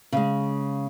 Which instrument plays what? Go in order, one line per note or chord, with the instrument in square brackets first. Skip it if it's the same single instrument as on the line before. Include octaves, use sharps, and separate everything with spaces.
[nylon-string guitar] C#3 G#3